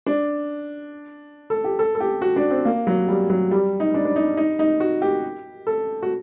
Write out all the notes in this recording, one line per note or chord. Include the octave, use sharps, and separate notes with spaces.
D4
A4
G4
A4
A4
G4
F#4
D4
C4
A#3
F#3
G3
F#3
G3
D#4
D4
D4
D#4
D#4
D#4
F#4
G4
A4
F#4